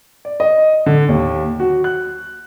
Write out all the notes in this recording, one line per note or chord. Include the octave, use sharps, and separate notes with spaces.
D5
D#5
D3
D#2
F#4
F#6